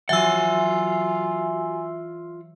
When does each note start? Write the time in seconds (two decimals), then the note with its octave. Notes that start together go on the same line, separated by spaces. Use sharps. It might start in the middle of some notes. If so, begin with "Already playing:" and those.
0.09 E3 F#3 F4 F#4 E5 F#5 G#5 E6